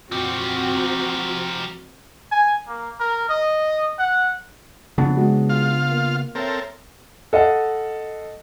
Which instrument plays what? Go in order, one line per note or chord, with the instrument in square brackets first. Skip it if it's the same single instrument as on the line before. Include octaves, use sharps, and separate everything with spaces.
[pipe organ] F2 A#2 [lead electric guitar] F3 G4 [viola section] C4 F#4
[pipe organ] A#5
[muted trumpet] G#5
A#3
A#4
D#5
F#5
[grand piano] F2 [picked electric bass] C#3 B3 D4
[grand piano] G#3 F#4
[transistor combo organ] F4 F5
[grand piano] A#3
[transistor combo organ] C4 A4 A#4 [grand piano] C#5 E5
[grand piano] A4 D#5 F5 F#5